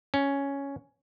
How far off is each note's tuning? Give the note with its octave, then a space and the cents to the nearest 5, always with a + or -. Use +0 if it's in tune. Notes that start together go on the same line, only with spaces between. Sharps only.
C#4 +5